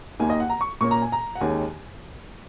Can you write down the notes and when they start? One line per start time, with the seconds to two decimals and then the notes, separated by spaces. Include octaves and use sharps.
0.20 D#2 D#3 A#3 G#5
0.30 D#5
0.40 F#5
0.49 A#5
0.61 C#6
0.81 A#2 A#3 C#4 C#6
0.91 A#5
1.02 G#5
1.12 A#5
1.35 F#5
1.41 D#2 D#3 G#3 C#4 G#5